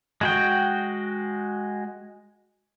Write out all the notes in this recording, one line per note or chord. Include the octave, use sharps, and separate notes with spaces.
G#3 F#4 G5